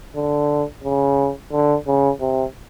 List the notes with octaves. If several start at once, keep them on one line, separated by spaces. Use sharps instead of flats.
D3
C#3
D3
C#3
C3